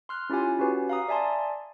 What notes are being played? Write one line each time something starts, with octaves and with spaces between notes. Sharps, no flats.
C6 F6 F#6
C#4 E4 F4 G4 G#5
C#4 F#4 G4 B4
F5 A#5 D#6
D5 E5 G#5 A5 C6